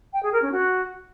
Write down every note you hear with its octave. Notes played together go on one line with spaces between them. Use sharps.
G5
G#4
A#4
C#4
F#4